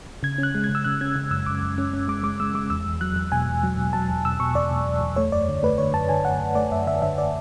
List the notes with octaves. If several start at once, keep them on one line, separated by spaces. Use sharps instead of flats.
C#3 G#6
C#4
F#6
G#3
G#6
C#3
E6
C#3 F#6
C#4 G#6
C#3
F#2 E6
F#2 D6
F#2
C#4
C#4
G#3 D6
G#3 D6
G#3 E6
G#3 D6
E2 E6
E2
F#3 F#6
E2
B2 G#5
E2
F#3
B2
F#3 A5
E2
B2 E6
B2 C#6
E2 D5
B2
E2
E2
A3 C#5
F#2 D5
D3
A3 B4
D3 C#5
F#2 A5
D3 G#5
F#2 F#5
F#2
A3 D5
F#2 E5
D3 E5
D3 E5
D5